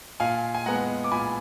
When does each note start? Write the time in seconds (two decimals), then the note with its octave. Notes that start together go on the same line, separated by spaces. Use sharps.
0.20 A#2 F5 G#5
0.55 G#5
0.66 G#3 B3 F#5 A#5
1.04 D6
1.11 A#2 G#5 B5